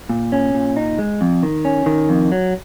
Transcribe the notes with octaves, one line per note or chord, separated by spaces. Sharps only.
A#2
C#4
A#2
D#4
G#3
F2
D#3
C#4
D#3
F2
F#3